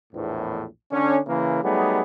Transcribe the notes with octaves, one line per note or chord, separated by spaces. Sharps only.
A#1 E2 A2
D3 C#4
C#3 E3 A#3
F#3 G3 A3 B3 D#4 G#4